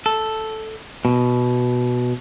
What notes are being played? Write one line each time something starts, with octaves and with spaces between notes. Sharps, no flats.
A4
B2